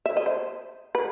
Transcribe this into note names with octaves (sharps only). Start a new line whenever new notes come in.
E5
D#5
C5
B4